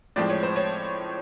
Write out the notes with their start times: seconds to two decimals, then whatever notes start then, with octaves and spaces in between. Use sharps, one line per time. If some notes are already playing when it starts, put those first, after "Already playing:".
0.16 A2 F3 G#3 C4 D5
0.30 C#5
0.43 C5
0.56 C#5